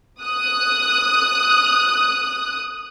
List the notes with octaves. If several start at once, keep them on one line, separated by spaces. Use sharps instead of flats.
D#6 F#6